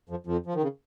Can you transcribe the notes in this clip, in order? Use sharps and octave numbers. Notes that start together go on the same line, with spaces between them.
F2 F3
F2 F3
F3
D#3
C#3